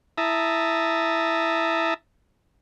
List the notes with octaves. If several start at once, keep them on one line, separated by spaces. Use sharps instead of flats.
E4 E5 A5 A#5 D#6